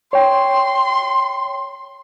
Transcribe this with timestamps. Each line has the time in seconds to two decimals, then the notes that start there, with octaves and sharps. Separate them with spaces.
0.13 C#5 G5 C6